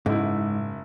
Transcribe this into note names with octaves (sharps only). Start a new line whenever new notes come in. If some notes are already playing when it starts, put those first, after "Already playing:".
F#1 G#2 E4